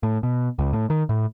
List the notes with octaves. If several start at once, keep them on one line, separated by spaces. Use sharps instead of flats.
A2
B2
C#2
A2
D#3
A2